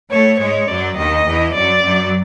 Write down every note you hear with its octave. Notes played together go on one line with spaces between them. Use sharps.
A2 A3 C#5
G#2 G#3 C#5
F#2 F#3 D5
D#2 D#3 D#5
E2 E3
F#2 F#3 D5
F#2 F#3